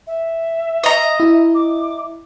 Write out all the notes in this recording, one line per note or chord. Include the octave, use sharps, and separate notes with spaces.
E5
D#5 A#5
E4
D6